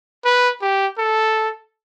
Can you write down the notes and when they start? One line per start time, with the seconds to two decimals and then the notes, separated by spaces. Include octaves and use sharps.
0.25 B4
0.62 G4
0.98 A4